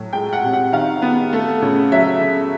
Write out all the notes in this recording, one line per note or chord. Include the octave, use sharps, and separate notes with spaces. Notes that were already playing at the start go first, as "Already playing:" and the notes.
Already playing: A2 F#3
G#3 G5
F#5
C3
F#5
D#3 F5
B3
A3
C#3
F#3 E5
C#3